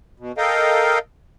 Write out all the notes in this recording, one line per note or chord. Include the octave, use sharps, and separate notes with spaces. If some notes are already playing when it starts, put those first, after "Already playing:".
B2
A4 A#4 D#5 F5 G5